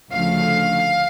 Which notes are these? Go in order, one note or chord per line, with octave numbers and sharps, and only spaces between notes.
D2 C#3 F3 A3 F5